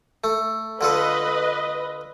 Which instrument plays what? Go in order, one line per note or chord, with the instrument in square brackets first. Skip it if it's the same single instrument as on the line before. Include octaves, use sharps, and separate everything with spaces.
[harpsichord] A3
[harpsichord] D3 F4 A4 [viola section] B4 D#5